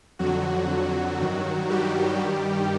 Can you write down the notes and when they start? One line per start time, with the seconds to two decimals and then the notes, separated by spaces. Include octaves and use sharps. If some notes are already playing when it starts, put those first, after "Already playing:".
0.19 F2 D3 F#3 F#4
1.20 G2 D#3
1.70 G3 G4
2.21 G2 D#3